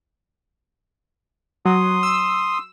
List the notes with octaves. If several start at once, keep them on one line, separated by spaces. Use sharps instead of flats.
F#3 C6 D#6
E6